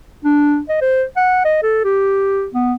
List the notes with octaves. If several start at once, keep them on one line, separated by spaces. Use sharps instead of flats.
D4
D#5
C5
F#5
D#5
A4
G4
B3